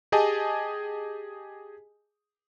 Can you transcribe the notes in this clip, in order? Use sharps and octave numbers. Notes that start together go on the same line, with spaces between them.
G4 G#4 D#5 G#5 A5